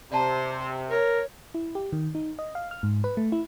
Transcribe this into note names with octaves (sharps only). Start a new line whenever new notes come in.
C3 C5 D5 A5 A#5
A#4 C#5
E4
G4
D#3
D#4
D#5
F5
F6
G#2
B4
A3
E4